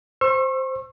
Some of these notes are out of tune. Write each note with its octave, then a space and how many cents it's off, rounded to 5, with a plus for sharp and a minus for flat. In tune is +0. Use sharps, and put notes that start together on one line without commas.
C5 +0 C#6 -35 E6 +25